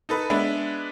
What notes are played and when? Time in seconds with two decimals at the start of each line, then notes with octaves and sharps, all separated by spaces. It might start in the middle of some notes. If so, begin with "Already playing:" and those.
0.09 D#4 A4 B4
0.30 G#3 B3 D4 B4 E5